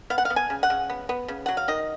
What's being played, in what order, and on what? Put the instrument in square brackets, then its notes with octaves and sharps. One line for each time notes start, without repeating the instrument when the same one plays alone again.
[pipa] B3 F5
F#5
F5
B3
G#5
C#3
F#5
C#3
B3
B3
C#3
F#3 F#5
F5
D#3 D#5